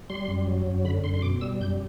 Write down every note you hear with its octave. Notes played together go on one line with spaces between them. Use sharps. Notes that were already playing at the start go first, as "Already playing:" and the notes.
G3 C6
F#2
F#3
F#2
D3 B5
F#2 C6
C6
B2 D6
G3 E6
F#2 G6